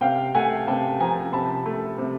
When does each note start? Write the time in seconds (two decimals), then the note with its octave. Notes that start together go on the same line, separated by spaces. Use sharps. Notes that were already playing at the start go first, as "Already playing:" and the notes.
0.01 C3 F5 G5
0.34 A3 F#5 G#5
0.67 C3 G5 A5
1.00 F3 G#5 A#5
1.33 C3 A5 B5
1.66 A3
1.98 C3